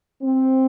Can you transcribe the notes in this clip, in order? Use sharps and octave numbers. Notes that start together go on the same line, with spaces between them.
C4